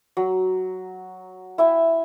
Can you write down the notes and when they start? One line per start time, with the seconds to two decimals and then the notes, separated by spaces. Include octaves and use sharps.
0.17 F#3
1.58 E4 E5 G5